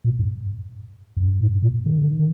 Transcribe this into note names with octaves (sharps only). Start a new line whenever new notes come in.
A#2
G2
F#2
G2
A2
A#2
D#3
D3
D#3